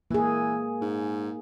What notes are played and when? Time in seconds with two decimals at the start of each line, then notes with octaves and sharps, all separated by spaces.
0.11 E3 A#3 G#4
0.82 G#2